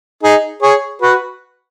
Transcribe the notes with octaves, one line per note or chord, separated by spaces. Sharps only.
D#4 G#4
G#4 C#5
F#4 B4